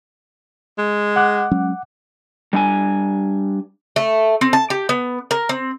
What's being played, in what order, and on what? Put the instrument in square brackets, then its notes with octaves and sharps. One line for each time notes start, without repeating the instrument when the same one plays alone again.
[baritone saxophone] G#3
[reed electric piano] F#5 D6 F#6
[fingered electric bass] F#3 G#3 C#4
[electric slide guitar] G3 D4 G5 G#5
[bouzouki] A3
C4
A5
G4
B3
A#4
C4